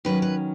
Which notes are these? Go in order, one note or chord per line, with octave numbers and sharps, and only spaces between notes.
D#3 F#3 C#4 B4
B4